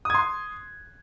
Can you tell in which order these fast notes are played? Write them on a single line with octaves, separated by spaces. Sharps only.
D#6 G#6 C6